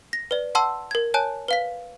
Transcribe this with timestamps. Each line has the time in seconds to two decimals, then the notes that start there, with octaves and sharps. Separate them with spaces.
0.13 A#6
0.31 B4 D5
0.55 F#5 A5 C6 E6
0.91 A#4 G#6
1.14 C#5 G#5 A5 F#6
1.48 B4 F5 B6